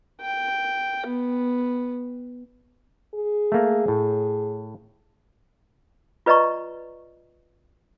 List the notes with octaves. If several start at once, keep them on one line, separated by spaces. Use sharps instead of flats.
G5
B3
G#4
A3 A#3
A2
F4 B4 D5 D#5 A#5 C#6